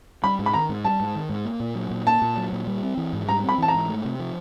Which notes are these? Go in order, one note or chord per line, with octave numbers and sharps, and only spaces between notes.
G3 B5
G#2
B5
D#3 A#5
G#2
G3 A5
G#2
D#3
G#2
A#3
A#2
F#3
A#2
A#3 A5
A#2
F#3
A#2
G3
C4
E3
G#2
G3 A#5
C4 B5
E3 A5
A#5
G#2
A3
C3
F3